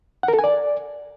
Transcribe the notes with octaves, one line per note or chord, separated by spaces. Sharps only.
F#5
A#4
A4
G#5
D5